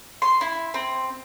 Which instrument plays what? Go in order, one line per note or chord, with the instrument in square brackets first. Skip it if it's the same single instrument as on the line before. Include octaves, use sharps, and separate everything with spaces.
[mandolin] C6
E4
C4